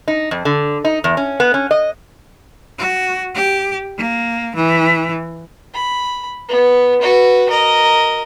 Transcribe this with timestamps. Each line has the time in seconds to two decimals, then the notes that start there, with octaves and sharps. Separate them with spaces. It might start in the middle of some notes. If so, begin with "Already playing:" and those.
0.08 D#4
0.31 F2
0.45 D3
0.85 D#4
1.04 E2
1.17 C#4
1.40 B3
1.54 C#4
1.71 D#5
2.78 F#4
3.35 G4
3.97 A#3
4.55 E3
5.74 B5
6.48 B3
7.01 F#4 B4
7.49 A#4 D#5